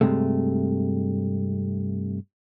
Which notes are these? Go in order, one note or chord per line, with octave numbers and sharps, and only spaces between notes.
G2 C3 G#3 A3